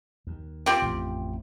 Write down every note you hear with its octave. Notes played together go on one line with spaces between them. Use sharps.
D#2
C4 F4 G4
A1 F2